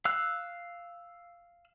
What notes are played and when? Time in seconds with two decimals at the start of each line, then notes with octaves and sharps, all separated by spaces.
0.05 F5 E6 F#6